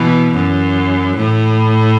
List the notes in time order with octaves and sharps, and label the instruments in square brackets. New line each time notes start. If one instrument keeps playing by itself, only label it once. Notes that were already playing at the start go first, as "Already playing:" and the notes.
Already playing: [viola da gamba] B2 E3
F#2
A2